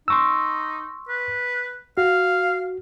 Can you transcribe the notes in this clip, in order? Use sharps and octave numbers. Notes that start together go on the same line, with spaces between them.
D#4 C6 C#6 E6
B4
F#4 F5